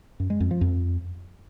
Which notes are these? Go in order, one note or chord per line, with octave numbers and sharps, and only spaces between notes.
F#2
G#3
F2
F3
F2